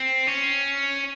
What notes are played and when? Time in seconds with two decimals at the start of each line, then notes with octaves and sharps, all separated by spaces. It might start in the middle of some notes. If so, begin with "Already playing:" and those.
Already playing: C4
0.27 C#4